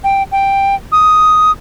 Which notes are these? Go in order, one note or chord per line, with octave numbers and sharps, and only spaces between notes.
G5
G5
D#6